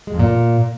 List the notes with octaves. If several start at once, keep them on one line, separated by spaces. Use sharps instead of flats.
G#3
F2
A#2